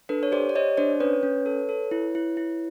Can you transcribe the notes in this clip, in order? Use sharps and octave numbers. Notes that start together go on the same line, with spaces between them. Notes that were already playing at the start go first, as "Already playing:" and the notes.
D4 A4 B4
C#5
G4 C5 D5
D5
G4 C#5 D#5
D4 C5 D5
C#4 B4 C#5
C#4
A4
A4
E4
E4
E4